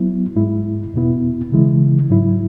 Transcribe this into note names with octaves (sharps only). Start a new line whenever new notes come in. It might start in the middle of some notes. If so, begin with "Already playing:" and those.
Already playing: F#3 B3 E4
G#2 G#3 E4
E2 B2 B3 E4
C#3 E3 G#3 E4
G#2 F#3 E4